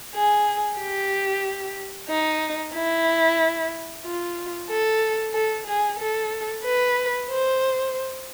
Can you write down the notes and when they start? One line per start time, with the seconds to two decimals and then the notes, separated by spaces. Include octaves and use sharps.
0.14 G#4
0.79 G4
2.09 D#4
2.74 E4
4.05 F4
4.70 A4
5.34 A4
5.67 G#4
5.99 A4
6.64 B4
7.29 C5